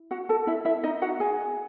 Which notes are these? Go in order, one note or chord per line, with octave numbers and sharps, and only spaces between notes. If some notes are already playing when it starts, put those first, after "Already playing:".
Already playing: E4
F#4 F#5
A4 A5
E4 E5
E4 E5
D#4 D#5
F#4 F#5
G#4 G#5